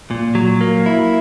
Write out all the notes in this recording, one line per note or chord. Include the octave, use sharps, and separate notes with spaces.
A#2
F#3
A#3
E4